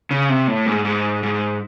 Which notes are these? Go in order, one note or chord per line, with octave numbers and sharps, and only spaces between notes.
C#3
C3
A2
G#2
G#2
G#2